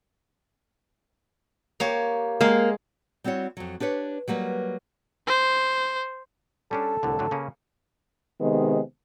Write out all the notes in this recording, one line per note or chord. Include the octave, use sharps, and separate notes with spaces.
A#3 G4 C#5
G#3 A#3 G4
G3 C4 E4 F#4 C#5
F2 F#3
D4 G4 B4 C#5
F#3 G3 A#3 B4
C5
G3 C#4 D4 A4
C2 A2 D3
A2 D3 F#3
C#3 A#3 C#4
C3 D#3 G#3 B3